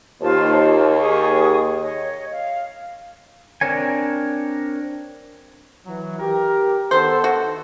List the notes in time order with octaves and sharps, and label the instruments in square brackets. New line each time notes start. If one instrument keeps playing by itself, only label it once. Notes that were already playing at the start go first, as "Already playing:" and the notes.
[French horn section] D#2 [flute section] F4 C5 A5
[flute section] G#4 C#6 D#6
C#5 D#5
F5
[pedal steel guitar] C4 D4 A#4 C#5 G#5
[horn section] E3 F#3
G4 A#4
[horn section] D#3 B3 A4 [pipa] C5
[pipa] F#4